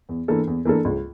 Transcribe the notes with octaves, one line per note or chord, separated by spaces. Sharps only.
E2
E3 A#3 D4 A4
E2
E3 A#3 D4 A4
C#2